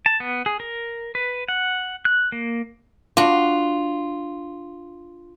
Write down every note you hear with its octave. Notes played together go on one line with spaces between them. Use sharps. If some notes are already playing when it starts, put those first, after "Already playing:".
A5
B3
G#4
A#4
B4
F#5
F#6
A#3
D4 F4 F#4